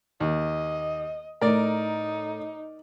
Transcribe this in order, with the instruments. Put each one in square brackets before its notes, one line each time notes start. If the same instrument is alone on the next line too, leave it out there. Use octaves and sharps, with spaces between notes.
[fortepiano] D#2 [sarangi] D#5
[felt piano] A2 [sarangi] D#4 [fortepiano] A#4 D5